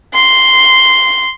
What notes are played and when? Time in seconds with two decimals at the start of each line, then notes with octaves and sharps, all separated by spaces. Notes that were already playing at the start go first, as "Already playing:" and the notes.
0.14 C6